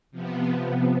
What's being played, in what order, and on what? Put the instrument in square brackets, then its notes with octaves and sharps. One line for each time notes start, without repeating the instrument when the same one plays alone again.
[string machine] C3 F3 B3